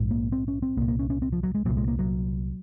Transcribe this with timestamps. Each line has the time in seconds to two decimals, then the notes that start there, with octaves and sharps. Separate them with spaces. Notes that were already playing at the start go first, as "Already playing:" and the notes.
Already playing: A#1 G#2
0.11 A#3
0.32 C4
0.48 C#4
0.62 C4
0.77 C2 A#3
0.81 A#2
0.88 A#3
0.99 C#4
1.10 C#4
1.22 C4
1.32 F3
1.43 F#3
1.55 G#3
1.65 C2 A#2 F#3
1.77 G#3
1.88 A#3
1.99 F#3